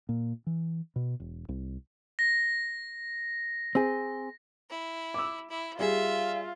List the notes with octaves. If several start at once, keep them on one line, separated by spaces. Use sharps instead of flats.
A#2
E3
B2
E1
C2
A#6
C4 G#4
E4
D6 E6
E4
G3 F4 G#4 E5